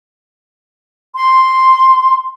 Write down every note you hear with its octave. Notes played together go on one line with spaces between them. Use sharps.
C6